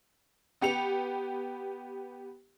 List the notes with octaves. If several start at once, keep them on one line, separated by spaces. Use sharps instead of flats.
B3 G4 C#7 F7